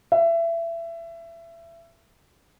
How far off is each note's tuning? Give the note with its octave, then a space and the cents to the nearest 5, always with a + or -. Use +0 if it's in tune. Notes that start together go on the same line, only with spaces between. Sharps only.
E5 +25